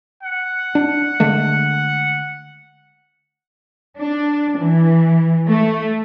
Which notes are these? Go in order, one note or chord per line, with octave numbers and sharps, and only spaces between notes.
F#5
D4
D3 G#3 A3
D4
E3
A3